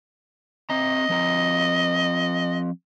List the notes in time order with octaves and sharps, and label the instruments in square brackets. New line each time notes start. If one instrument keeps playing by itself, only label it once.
[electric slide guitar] C4 A#5 [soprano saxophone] D#5
[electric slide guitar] F3 C4 A#5